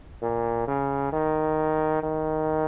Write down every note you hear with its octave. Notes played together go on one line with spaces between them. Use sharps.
A#2
C#3
D#3
D#3